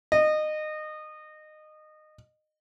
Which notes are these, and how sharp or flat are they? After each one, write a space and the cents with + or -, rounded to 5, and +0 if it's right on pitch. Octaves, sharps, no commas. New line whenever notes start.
D#5 -20